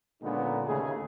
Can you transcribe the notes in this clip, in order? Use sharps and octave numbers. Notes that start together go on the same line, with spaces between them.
A#2 D3 G#3 B3 C#4 D#4
D#2 C#3 A3 D#4 G#4